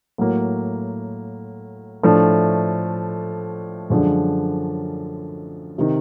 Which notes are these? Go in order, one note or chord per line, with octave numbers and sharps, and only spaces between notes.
A2 F#3 A#3
A2 F3 A3 D4
F#2 D3 F3 G#3
C3 D#3